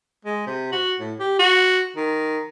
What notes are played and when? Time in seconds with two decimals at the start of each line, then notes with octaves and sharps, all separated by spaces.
0.25 G#3
0.47 C3
0.72 F#4
0.99 A2
1.20 G4
1.39 F#4
1.96 D#3